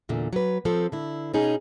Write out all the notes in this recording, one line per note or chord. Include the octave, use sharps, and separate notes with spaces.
E2 A#2 D3
F#3 B4
F3 C4 A4
D3 E4
B2 C#4 D#4 G#4